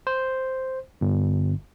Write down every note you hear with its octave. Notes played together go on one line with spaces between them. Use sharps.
C5
G1